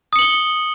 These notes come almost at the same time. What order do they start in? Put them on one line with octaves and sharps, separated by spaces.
D#6 C#7 F#7 G7